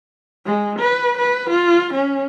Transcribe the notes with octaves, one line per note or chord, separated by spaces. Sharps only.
G#3
B4
B4
F4
C#4